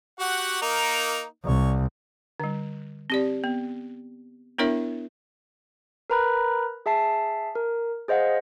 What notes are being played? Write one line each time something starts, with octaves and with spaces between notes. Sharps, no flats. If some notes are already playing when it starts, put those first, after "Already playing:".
F#4 G4 F#5
A#3 D#4 A#4
C2 C#5
D3 G3
C4 G4 D5
B3
B3 D4 E4 A#4 C#5 E5
A#4 B4 A#5 B5 F#6
G#4 E5 A5 C7
A#4
G#4 C5 D#5 F5 F#5